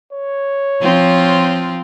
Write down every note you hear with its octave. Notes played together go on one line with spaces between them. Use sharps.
C#5
F3 C4 F4